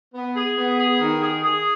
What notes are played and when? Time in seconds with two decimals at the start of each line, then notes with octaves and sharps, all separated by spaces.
0.14 B3
0.36 G#4
0.57 B3
0.79 G#4
1.00 D#3
1.22 G#4
1.42 G#4